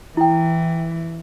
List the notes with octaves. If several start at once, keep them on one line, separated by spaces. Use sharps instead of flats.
E3 E4 G5